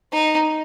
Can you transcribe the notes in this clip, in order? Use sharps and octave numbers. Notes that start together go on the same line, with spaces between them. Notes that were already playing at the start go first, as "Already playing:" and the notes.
D#4